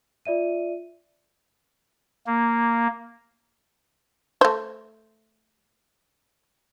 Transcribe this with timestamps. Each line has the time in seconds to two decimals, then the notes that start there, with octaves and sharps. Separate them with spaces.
0.25 F4 D5 E5 D#7
2.27 A#3
4.41 A3 C5